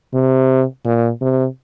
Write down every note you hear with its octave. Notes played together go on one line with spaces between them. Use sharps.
C3
A#2
C3